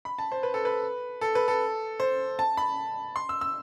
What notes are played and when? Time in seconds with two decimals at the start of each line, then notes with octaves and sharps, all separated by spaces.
0.05 B5
0.19 A5
0.32 C5
0.43 B4
0.54 A4
0.65 B4
1.21 A4
1.35 B4
1.48 A4
2.00 C5
2.39 A5
2.57 B5
3.16 C6
3.29 E6
3.41 E6